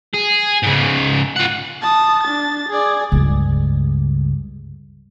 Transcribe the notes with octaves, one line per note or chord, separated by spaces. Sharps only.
G#4
G#2 C#3
F4 F#5
A5 D#6
D4 A6
G#4 D5
C#2 G2